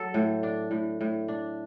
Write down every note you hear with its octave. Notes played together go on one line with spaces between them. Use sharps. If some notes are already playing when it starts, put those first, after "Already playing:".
Already playing: F#3 A4
A2
D4
A2
A2
D4